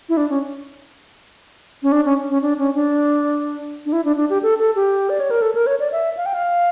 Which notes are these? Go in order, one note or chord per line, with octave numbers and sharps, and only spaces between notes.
E4
D4
C#4
C#4
D4
C#4
C#4
D4
C#4
D4
D4
E4
D4
D4
G4
A4
A4
G4
D5
C#5
A#4
A4
A#4
C#5
D5
E5
F5
G5
F5